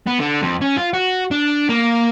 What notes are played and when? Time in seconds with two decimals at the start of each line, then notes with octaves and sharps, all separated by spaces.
0.07 B3
0.19 D3
0.42 F2
0.61 C#4
0.77 F4
0.93 F#4
1.31 D4
1.69 A#3